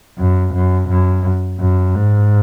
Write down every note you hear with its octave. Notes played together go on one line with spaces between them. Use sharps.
F#2
F#2
F#2
F#2
G#2